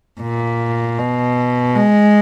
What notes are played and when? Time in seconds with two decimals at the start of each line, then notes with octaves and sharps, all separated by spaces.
0.22 A#2
0.99 B2
1.76 G#3